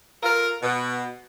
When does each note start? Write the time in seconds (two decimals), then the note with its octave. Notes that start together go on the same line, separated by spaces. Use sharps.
0.23 F4 A4 A#4
0.61 B2